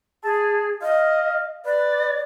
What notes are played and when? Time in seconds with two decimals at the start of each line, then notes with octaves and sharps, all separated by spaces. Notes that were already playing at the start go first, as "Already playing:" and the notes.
0.24 G#4 A5
0.82 D#5 F5
1.66 B4 D5